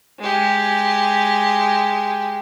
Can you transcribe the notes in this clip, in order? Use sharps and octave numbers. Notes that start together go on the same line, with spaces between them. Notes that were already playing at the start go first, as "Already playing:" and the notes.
G#3 G4